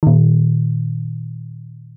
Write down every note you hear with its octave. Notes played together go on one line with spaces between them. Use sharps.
A#2 D#3